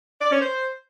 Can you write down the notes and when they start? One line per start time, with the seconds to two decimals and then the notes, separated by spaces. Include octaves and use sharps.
0.21 D5
0.31 C#4
0.41 C5